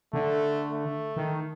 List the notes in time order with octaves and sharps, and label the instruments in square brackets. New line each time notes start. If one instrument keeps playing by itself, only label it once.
[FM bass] D3 [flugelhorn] A3
[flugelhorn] A3
[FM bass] D#3